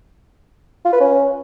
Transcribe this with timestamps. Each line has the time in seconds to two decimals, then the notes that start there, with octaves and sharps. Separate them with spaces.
0.85 F4
0.93 B4
1.00 C#4